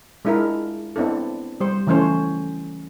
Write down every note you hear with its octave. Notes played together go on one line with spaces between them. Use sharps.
G#3 D4 E4 F4 A#4
B3 C4 D4 E4 A4
G3 C5
C#3 E3 F3 A3 C#4 C5